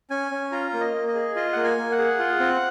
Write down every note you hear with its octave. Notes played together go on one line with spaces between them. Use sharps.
C#4 G#5
C#4
F4 A#5
A#3
D#5
A#3
D#5
G#4
F4 D#5
A#3 F#5
G#5
A#3
F#5
G#4
F4
C4